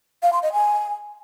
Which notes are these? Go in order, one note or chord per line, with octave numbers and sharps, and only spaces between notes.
F5
C6
D#5
G#5